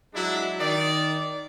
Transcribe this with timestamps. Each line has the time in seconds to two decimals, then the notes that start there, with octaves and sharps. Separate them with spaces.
0.14 F#3 G#3 D4 E4
0.60 D#3 D5